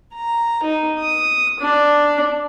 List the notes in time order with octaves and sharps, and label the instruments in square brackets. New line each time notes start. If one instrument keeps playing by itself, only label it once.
[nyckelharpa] A#5
D#4
D#6
D4